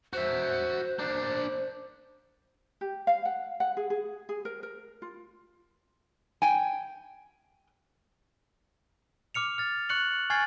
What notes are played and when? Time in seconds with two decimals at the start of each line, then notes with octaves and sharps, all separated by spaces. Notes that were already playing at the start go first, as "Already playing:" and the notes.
0.13 F#4 C5 E5
0.99 A#3 D4
2.81 G4
3.07 F5
3.25 F#5
3.60 F#5
3.77 G#4
3.90 G#4
4.29 G#4
4.45 A#4
4.63 A#4
5.02 F4
6.42 G5 G#5
9.34 D6 F6 C#7 F7
9.58 F6 A6
9.89 C#6 F#6 C#7 F#7
10.30 G#5 C#6 F6 G#6 A6 C7